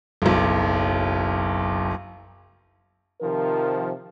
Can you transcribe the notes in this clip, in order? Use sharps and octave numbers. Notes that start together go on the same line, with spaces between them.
F#1 B1
C3 D#3 F3 A#4